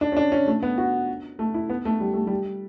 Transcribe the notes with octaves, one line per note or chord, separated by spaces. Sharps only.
D4
C#4
D4
C#4
A3
B3
F#4
A3
E4
B3
A3
G3
A3
G3